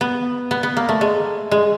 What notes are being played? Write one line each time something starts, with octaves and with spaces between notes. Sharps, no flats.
B3
B3
B3
A#3
A3
G#3
G#3